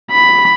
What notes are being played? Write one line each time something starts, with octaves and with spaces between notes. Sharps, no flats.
B5